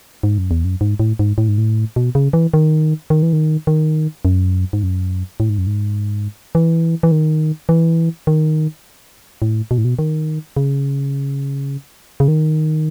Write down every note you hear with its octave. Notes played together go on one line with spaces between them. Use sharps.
G#2
F#2
E2
F#2
G#2
A2
G#2
A2
G#2
A2
B2
C#3
E3
D#3
D#3
E3
D#3
D#3
F#2
G#2
F#2
A2
G#2
F#2
G#2
E3
E3
D#3
E3
D#3
A2
B2
A2
B2
D#3
C#3
C#3
D#3